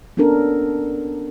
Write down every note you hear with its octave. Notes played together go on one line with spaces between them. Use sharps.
B3 C#4 D4 A4 A#4